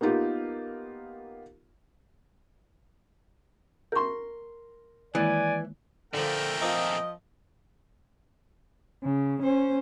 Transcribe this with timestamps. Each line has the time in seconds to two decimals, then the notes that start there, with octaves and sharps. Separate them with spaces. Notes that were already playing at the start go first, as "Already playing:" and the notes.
0.01 A#3 B3 D#4 F4 G4
3.92 A#4 C6 C#6 G6
5.15 D#3 E3 G#3 A#3 D5 G#5
6.14 A#2 D3 F3 A3 A#4 G5
6.62 F3 A#3 C4 F4 D#5
9.02 C#3
9.41 C#4 C5